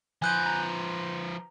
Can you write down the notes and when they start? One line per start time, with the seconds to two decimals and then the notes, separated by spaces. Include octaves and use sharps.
0.22 F3 B4 G#5 F#6 G6
0.46 A#5